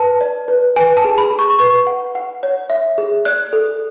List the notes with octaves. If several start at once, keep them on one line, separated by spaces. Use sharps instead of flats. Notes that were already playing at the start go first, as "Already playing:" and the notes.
Already playing: B4 A5
D5
B4
B4 G#5
A5
G#4
B5
G#4
C#6
B4 C#6
F#5
F#5
C#5
E5
G#4
D5 F#6
A4